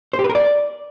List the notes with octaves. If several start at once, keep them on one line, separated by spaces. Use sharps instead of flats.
C5
G4
B4
A#4
D5